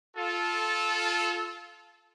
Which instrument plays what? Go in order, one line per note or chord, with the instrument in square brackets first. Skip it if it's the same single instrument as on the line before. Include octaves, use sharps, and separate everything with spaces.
[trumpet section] F4 A4